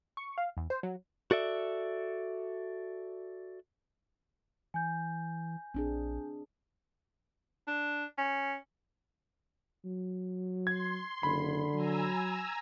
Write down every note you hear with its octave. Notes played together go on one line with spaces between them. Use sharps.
C#6
F5
E2
C5
F#3
F#4 A4 D5 E5
E3 G#5 G6
A#1 C4 D4 G#4
D4
C#4
F#3
C6 G#6
F#1 D3 B5
F#3 G#5 A#5 E6